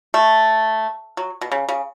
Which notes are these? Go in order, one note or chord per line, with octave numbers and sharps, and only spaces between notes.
A3
F#3
B2
C#3
C#3